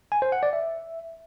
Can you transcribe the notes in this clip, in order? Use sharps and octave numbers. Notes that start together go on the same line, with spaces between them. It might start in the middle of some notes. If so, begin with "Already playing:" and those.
G#5
C5
F#5
D5
E5